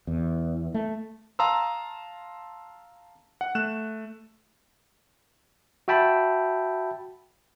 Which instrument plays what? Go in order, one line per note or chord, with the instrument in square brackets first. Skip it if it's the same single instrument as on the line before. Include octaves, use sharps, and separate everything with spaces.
[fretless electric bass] E2
A3
[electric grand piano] F5 A5 A#5 C6 D#6 E6
F#5
A3 F#6 E7
[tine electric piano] F#4 E5 G5 A5 B5